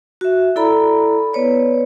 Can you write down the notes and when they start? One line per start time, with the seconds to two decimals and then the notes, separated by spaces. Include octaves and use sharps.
0.21 F#4 E5
0.56 E4 A4 D5 A#5 B5
1.33 B3 B4 C#5 D5